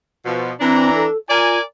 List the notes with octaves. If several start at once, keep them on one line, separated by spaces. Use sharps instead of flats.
B2 F3
E3 C4 D4 A#5
A4
F4 A#4 D5 G#5